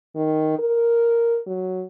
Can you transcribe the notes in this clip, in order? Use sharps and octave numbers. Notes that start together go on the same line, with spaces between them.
D#3
A#4
F#3